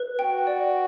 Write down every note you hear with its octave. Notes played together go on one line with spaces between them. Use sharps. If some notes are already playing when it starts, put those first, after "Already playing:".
Already playing: B4
F#4 G5
D5